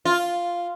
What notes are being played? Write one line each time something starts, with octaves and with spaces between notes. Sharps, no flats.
F4